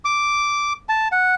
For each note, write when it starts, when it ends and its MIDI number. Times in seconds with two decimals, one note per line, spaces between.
0.05 0.73 86
0.89 1.08 81
1.12 1.35 78